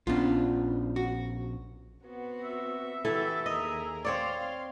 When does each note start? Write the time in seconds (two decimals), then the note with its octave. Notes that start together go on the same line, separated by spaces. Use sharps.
0.07 A#1 B3 C#4 D4 F4
0.96 F#4
2.04 B3 C4 F#4
2.43 E5
3.05 E3 E4 F#4 G4 A4 G5
3.46 D#2 G#4 A#4 D#5
4.05 C4 C#5 D5 F5 C6